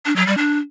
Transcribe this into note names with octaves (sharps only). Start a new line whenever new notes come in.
D4
F#3
G3
D4